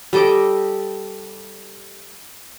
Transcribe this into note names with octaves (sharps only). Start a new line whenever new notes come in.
G3 A4 D#5 D6